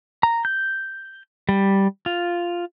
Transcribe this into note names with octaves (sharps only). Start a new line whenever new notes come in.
A#5
G6
G3
F4